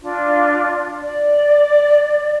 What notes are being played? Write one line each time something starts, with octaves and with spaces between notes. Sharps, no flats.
D4 F4
D5